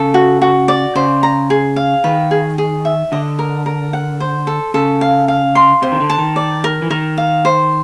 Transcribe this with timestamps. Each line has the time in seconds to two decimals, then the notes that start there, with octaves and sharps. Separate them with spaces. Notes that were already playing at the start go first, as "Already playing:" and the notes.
Already playing: C#3 A4
0.14 F#4
0.42 F#4
0.68 D5
0.96 C#3 C5
1.23 A#5
1.50 G#4
1.76 F5
2.04 D#3 B4
2.31 G#4
2.58 G#4
2.85 E5
3.12 D3 D#5
3.39 A#4
3.66 A#4
3.93 F#5
4.20 C5
4.47 A4
4.74 C#3 A4
5.01 F5
5.28 F5
5.55 C6
5.82 C3 C5
5.92 D#3
6.00 D3
6.10 A5
6.19 D#3
6.36 D5
6.64 A#4
6.82 E3
6.90 D#3 A#4
7.18 F5
7.45 C5